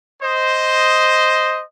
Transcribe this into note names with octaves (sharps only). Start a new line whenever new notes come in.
C5 D#5